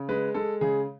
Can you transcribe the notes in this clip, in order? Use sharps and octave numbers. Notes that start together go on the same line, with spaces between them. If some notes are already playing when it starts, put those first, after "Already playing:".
Already playing: C#3
G#3 B4
G#3 A4
C#3 G#4